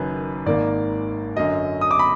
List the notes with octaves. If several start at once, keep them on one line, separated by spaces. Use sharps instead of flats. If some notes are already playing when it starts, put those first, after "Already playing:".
Already playing: F#1 F#2 D#3 B4
G#1 G#2 D#3 A#3 D5
F#2 D3 F#3 D#5
D#6
D6
B5